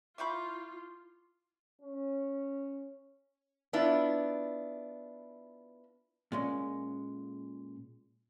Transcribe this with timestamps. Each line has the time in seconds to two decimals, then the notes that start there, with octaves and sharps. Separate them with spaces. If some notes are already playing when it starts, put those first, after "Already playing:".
0.18 E4 F4 E5 F5 B5 C#6 D6 G6
1.82 C#4
3.73 B3 D4 E4 F4
6.32 A#2 G#3 C#4